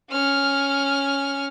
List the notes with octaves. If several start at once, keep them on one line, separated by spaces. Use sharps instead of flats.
C#4 F6